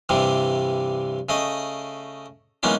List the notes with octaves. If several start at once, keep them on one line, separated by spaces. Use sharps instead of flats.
G2 C3 E3 G3
C#3 A3 D#5 D#6
E3 G#3 A#3 B3 C#4 D#4